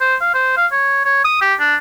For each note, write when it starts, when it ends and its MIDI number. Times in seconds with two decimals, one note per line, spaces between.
0.01 0.16 72
0.21 0.31 77
0.34 0.52 72
0.57 0.67 77
0.72 1.01 73
1.05 1.21 73
1.25 1.40 87
1.42 1.54 67
1.60 1.75 62